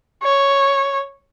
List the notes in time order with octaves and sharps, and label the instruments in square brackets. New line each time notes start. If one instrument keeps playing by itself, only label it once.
[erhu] C#5